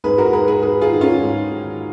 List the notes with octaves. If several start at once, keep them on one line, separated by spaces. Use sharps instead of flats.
G#2 G#4 B4
F#4 A#4
G#2 G#4 B4
G#4 B4
D#3 G#4 B4
F4 G#4
D#3
C#4 F4
G#2
D#3